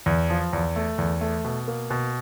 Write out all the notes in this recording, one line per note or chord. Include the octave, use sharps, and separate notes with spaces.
E2
F3
E2
A3
E2
A3
B2
A#3
B2